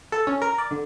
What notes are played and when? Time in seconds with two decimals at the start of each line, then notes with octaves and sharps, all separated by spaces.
0.12 A4
0.27 C#4
0.42 A#4
0.58 D5
0.71 D3